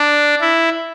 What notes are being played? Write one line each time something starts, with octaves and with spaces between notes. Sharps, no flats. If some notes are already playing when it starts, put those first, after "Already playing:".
Already playing: D4
E4